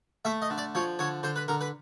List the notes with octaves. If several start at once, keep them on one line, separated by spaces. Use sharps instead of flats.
A3 E5
D#5
D3
D5
F3 C#5
D3 C#5
D3 C5
B4
D3 A#4
B4